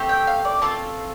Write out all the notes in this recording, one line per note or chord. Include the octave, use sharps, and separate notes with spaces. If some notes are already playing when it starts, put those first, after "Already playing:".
Already playing: A3 C4 G4
G5
F5
D5
A3 C4 F4 A5